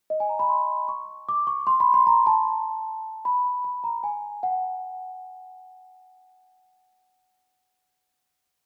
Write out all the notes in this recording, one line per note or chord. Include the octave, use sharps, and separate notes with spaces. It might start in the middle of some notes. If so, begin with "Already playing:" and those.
D#5
G#5
A#5
B5
C6
C#6
D6
C#6
C6
B5
C6
A#5
A5
B5
B5
A#5
G#5
F#5